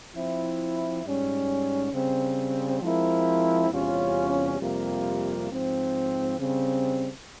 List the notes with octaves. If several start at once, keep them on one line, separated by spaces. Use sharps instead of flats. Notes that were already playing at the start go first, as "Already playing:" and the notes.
F3 C4 E4
G#2 G3 C#4
C#3 G3 C4
F3 G#3 C4 E4 A#4
E2 C3 G3 C#4 F4
F2 C3 G3 A#3 F4
G#2 F3 C4
C#3 G3 C4